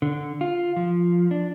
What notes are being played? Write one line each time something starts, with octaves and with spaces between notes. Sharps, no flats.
D3
F4
F3
D4